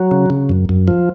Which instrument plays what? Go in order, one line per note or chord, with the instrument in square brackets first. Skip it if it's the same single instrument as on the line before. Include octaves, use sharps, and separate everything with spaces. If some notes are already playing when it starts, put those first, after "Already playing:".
Already playing: [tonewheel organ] F#3
C#3
C#3
F#2
F#2
F3